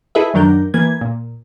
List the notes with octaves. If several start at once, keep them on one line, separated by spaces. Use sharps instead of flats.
E4 G#4 A4 B4 D#5 E5
F#2 D#3 F#3 D4 A#4 G6
E3 A#3 B4 G#6
A#2